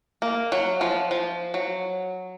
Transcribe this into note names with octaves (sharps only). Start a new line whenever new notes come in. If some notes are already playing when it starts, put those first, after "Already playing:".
A#3
F#3
F3
F3
F#3